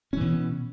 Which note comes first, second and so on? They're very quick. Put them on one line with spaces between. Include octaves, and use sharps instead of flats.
C#4 E3 B2